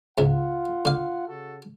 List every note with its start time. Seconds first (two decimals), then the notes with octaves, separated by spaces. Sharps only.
0.18 C#2 G#2 F4 F#5
0.85 D3 F5
1.27 C#3 F#4 A4